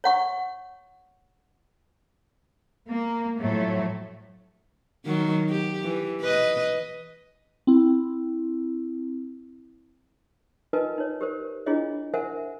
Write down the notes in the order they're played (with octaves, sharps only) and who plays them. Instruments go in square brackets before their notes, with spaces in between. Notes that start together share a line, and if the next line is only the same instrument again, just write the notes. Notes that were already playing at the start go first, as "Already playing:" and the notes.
[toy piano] C#5 F#5 C#6
[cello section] A#3
A2 F3 F#3 A3
[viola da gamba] D#3 F#3
G4
E3
B4 D#5
[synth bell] C4 E4
[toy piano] D#4 F4 A#4 B4 D#5 G#5
D#4 C#5
G4 A#4 C5
D4 E4 F4 G#4 C#5 D#5
A#4 C5 E5 F#5 G#5